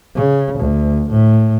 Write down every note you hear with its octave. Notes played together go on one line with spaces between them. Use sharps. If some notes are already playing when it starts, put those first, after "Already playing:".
C#3
D2
A2